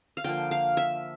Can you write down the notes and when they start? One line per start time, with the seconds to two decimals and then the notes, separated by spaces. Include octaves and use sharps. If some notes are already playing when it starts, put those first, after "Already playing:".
0.17 F5
0.24 D3 F3 A#3 G5
0.51 F5
0.77 E5